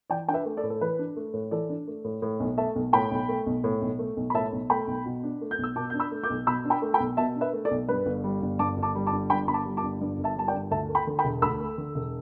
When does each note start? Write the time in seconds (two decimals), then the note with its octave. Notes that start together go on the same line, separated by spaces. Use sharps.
0.10 E3 D5 G5
0.28 D4 G5
0.33 B4 E5
0.46 A3
0.57 A4 D5
0.63 A2
0.70 A4
0.81 E3 B4
0.99 D4
1.17 A3
1.34 A2
1.51 E3 A4 D5
1.69 D4
1.87 A3
2.05 A2
2.22 A2
2.40 B1
2.58 A3 E5 A5
2.76 B1
2.93 A2 G5 B5
3.11 B1
3.29 A3
3.46 B1
3.64 A2
3.82 B1
3.99 A3
4.17 B1
4.30 B5
4.34 A2 E5 A5
4.52 B1
4.70 A3 G5 B5
4.87 B1
5.06 B2
5.23 D4
5.41 A3
5.51 G6
5.58 B1
5.64 E6
5.76 B2 A5 D6
5.90 D4 G6
6.00 B5 E6
6.12 A3
6.23 D6 G6
6.30 B1
6.47 B2 B5 E6
6.65 D4
6.70 G5 B5
6.82 A3
6.94 G5 B5
7.00 B1
7.17 B2 E5 A5
7.36 D4
7.41 B4 E5
7.53 A3
7.65 A4 D5
7.71 B1
7.89 G2 B4
8.06 G1
8.24 G3
8.42 G1
8.59 G2 A5 D6
8.77 G1
8.83 A5 D6
8.95 G3
9.07 A5 D6
9.12 G1
9.30 G2 G5 B5
9.48 G1 B5
9.54 A5 D6
9.66 G3
9.77 A5 D6
9.83 G1
10.01 G2
10.18 G1
10.24 E5 A5
10.36 G3 A5
10.48 D5 G5
10.54 G1
10.71 D2 E5 A5
10.89 A3
10.95 G5 B5
11.07 D3
11.19 G5 B5
11.24 E1
11.42 D2 B5 E6
11.60 A3
11.78 D3
11.95 E1